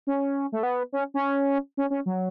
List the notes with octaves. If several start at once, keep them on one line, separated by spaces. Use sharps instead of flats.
C#4
A3
B3
C#4
C#4
C#4
C#4
F#3